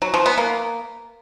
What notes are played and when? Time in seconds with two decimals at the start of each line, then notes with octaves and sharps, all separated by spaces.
0.02 F#3
0.14 F3
0.26 B3
0.38 A#3